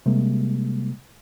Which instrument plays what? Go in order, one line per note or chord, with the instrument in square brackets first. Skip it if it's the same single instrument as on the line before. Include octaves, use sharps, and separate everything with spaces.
[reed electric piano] C3 G3 G#3 A#3